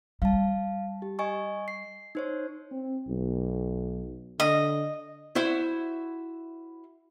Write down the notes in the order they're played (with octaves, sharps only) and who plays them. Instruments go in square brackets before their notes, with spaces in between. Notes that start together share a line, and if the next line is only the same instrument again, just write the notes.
[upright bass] G3 [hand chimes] F5 A5
[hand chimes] G4
D#5 G#5 C#6
C7
D#4 C5 C#5
[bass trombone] C4
B1
[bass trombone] D3 [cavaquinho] D#5
[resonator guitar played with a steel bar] E4 F#4 C5 E5